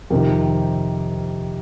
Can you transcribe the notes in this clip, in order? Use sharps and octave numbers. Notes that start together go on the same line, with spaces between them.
F2 C3 D#3 G4 A#4